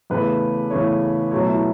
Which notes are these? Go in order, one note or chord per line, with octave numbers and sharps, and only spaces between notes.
E2 C#3 E3 A3 B4
E2 C#3 E3 A3 C#5
B2 F#3 A3 C#5
E4